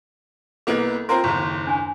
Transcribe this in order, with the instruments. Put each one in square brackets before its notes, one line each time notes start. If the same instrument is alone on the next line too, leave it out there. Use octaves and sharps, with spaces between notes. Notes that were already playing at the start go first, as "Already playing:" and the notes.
[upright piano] C2 A#3 B3 [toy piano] A4 D#5
[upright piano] C4 F4 A#4 [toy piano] C5 A#5 C6
[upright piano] F#1 D#2 [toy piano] A#5 C#6
[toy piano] D4 G#5